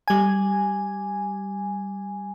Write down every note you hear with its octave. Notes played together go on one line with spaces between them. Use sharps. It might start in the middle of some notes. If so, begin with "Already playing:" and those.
G3 G#5